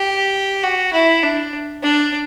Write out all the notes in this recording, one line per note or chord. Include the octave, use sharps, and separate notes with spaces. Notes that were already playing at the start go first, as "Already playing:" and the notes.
Already playing: G4
F#4
E4
D4
D4